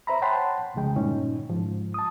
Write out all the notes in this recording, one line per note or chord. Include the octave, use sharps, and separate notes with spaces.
C5 E5 A#5 B5
C#5 F#5 G5 A5 B5 C6
C2 F2 C#3 G#3 G5
G2 A#2 D3 C#4 D#4
G#2 F3
A5 D#6